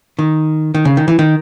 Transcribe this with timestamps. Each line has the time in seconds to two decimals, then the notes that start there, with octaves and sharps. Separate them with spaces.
0.19 D#3
0.74 D#3
0.85 C#3
0.97 D#3
1.08 E3
1.19 D#3